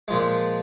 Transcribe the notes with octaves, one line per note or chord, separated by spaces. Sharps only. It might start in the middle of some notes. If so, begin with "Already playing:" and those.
A#2 F3 G#3